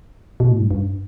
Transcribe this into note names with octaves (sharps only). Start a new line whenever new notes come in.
B2
A2
G2
G2